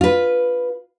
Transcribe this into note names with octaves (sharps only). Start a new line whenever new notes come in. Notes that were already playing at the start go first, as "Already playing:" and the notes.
F4 B4